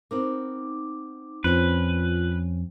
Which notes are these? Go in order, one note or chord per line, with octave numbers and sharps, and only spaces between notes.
B3 C4 D#4 A#4 D6
F2 C4 C#4 F4 B4